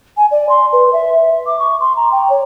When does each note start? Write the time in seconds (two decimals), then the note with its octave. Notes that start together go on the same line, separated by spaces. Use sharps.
0.17 G#5
0.31 D5
0.49 C6
0.73 B4
0.93 E5
1.46 D6
1.59 C#6
1.81 C6
1.96 A#5
2.12 G5
2.30 C#5